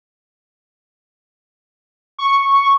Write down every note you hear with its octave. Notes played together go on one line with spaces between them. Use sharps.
C#6